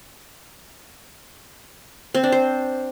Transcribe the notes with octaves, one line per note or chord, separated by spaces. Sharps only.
C4
D4
C5